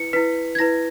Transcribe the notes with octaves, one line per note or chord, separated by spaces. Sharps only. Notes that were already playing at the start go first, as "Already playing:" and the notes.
Already playing: E4 B4 C#7
E4 B4 B6
G#6
E4 B4 A#6